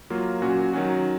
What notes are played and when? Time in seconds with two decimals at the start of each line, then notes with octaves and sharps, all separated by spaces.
0.10 F#3 A#3 F4
0.42 A#2 F#3 C#4 F#4
0.73 D#3 F#3 C#4 F#4